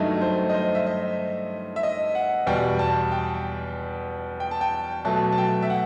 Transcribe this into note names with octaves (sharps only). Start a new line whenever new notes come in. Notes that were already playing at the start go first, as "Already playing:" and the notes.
Already playing: G2 D#3 F#3 A3 D#5
C5
D#5
C5
E5
D#5
E5
D#5
F#5
E2 B2 G3 G5
A5
G5
G5
A5
G5
B2 F#3 A3 A5
A5
G5
E5
F#5